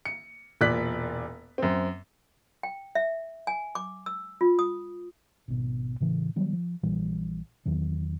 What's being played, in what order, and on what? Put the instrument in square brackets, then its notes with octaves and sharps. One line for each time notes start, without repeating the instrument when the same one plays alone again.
[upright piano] C#7
E1 A#2 D5 F#6 B6
F#2 C4
[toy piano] G5
E5
G#5
D6
E6
F4
D#6
[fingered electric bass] G#1 B2
A2 C#3 E3
D#3 F#3 G3 B3
F3
A#1 A#2 E3 G3
E2 D#3 F#3